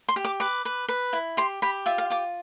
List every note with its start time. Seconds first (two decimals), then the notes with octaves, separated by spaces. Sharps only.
0.09 C6
0.16 G4
0.25 D6
0.40 B4 D6
0.65 B4
0.89 B4
1.13 E4
1.37 G4 C6
1.62 G4 B5
1.86 F4 E5
1.98 F5
2.10 F4 D6